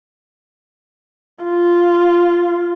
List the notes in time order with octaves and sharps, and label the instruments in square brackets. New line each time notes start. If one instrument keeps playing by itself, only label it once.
[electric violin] F4